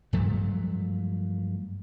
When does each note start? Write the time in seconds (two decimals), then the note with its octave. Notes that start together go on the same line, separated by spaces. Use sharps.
0.13 G2 F3 F#3 A3